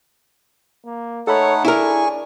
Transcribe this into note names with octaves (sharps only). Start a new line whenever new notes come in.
A#3
A3 D#4 A4 C#5 F#5 B5
D4 E4 G#4 A#4 G#5 C#6